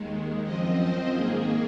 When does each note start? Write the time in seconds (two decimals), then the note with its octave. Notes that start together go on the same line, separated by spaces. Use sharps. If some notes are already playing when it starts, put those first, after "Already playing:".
Already playing: D#2 D#3 G#3
0.44 F#2 F3 C4 D#5
0.79 C5
1.15 G#2 D#3 A#3 G#4